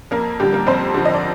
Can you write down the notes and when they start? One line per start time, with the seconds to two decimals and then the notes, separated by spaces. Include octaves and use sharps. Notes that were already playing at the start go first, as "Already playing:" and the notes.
0.11 F2 A#3 A#4
0.40 D3 F3 G3 G4
0.53 A#3 A#4
0.67 F2 C4 C5
0.94 D3 F3
1.05 D#5
1.14 D5